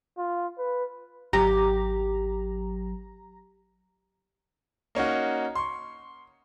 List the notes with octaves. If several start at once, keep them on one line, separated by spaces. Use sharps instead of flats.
F4
B4
G#1 F#3 G4 A#5
A#3 C#4 D#4 F#4
C6 C#6